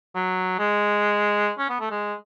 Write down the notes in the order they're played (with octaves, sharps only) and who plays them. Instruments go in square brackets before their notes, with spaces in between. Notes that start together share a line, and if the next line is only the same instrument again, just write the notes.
[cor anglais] F#3
G#3
C#4
B3
A3
G#3